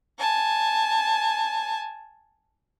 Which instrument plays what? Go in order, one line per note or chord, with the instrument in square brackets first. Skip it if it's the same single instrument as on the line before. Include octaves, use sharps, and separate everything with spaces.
[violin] G#5 A5